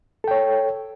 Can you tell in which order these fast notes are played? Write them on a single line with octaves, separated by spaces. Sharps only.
A4 G5 C#5